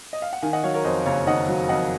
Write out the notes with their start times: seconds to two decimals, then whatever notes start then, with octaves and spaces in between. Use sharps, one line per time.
0.13 D#5
0.22 F5
0.33 F#5
0.42 D#3 F5 G#5
0.53 D#5 F#5
0.64 F#3 C#5 F5
0.74 A#4 C#5
0.85 F2 C5 D#5
1.06 F#1 C#5 F5
1.27 D#3 D#5 F#5
1.48 F#3
1.69 F2 D#5 F#5